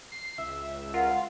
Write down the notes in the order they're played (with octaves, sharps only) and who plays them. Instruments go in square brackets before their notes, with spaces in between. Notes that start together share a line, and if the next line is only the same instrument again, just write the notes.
[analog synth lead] C7
[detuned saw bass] C#2 [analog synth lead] E5
[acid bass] F4 [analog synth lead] A#4 [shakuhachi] F#5
[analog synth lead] F5